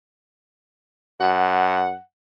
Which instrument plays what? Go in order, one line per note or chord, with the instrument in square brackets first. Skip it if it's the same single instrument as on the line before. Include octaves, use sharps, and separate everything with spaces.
[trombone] F#2 [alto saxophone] F#5